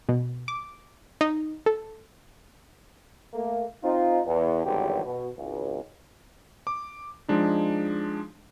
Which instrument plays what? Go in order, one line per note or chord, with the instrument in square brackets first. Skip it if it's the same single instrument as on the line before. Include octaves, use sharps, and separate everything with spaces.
[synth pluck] B2
D6
D#4
A4
[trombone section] A3 A#3
C4 D#4 F4
E2
G#1 E2 G2 D3 F#3 G4
B2
G#1 C#2
[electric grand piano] D6
F3 G#3 D4 D#4